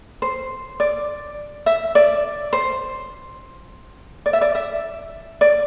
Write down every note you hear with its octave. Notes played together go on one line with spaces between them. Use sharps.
C5
D5
E5
D5
C5
D5
E5
D5
E5
D5